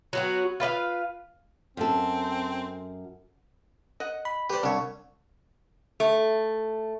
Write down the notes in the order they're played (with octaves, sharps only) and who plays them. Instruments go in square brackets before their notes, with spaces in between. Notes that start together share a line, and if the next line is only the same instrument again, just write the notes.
[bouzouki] F#3 B3 F#4
F4 B4 D#5 F5
[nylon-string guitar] F#2 A4 [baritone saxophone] C4
[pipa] D#5 F#5
[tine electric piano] B5
[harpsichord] G4 C5 [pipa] B4 D5
[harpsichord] C2 C#5 [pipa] D4
[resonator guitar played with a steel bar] A3